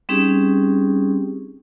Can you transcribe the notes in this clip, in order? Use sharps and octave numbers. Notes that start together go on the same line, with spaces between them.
G3 C4 C#4 D#4 G4 G#4